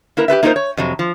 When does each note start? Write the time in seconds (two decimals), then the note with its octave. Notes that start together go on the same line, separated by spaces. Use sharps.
0.17 A#3 E4 A#4 B4
0.28 G4 A4 B4 E5
0.43 A#3 D#4 F4 F#4 A#4 C5
0.56 C#5
0.77 F2 C3 F#3
0.99 F3